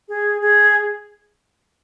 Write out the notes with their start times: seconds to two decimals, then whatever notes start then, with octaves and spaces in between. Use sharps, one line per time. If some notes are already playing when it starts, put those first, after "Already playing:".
0.08 G#4
0.41 G#4